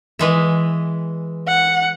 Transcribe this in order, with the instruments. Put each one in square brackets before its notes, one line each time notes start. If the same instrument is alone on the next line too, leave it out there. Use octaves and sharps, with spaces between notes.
[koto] E3 G#3 E5
[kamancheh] F#5